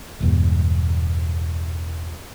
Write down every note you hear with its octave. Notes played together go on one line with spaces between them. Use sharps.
E1 E2 G2